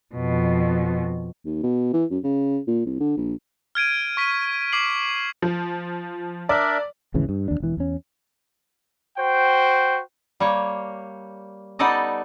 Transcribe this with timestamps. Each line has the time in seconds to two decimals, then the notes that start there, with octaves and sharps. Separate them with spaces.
0.15 F2 B2
1.45 D#2
1.63 B2
1.93 E3
2.11 F#2
2.23 C#3
2.67 A#2
2.86 C2
3.00 D3
3.17 A#1
3.75 F6 G#6 D7 D#7
4.17 C#6 B6 D#7
4.73 D6 C7 F#7
5.42 F3
6.49 D4 A#4 D5 E5
7.14 G#1 D2 C#3 E3
7.29 G2
7.48 D#2 D4
7.60 E1 E3
7.77 E2 C#4
9.18 F#4 C5 G5
10.40 G3 A#3 C#5
11.79 G3 B3 D#4 A4 D5 D#5